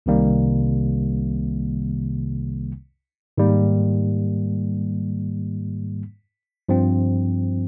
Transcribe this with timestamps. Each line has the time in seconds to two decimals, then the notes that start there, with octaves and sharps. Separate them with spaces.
0.06 C2 C3 D#3 G3 A#3
3.38 G#2 D#3 G3 A#3
6.69 G2 F3 C4